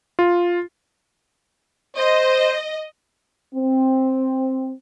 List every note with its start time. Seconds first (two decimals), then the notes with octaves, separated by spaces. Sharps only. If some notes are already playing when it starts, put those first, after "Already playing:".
0.19 F4
1.96 C5 D#5
3.55 C4